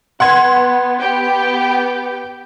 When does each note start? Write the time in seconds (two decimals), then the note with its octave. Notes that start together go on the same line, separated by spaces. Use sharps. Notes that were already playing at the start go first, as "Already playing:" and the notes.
0.20 B3 F#5 C6 G#6
0.99 B3 G4 G5